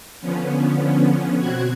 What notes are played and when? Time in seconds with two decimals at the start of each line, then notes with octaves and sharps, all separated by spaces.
0.21 D3 F3 B3 C#4
1.37 B2 C4 F#4 F#6 G#6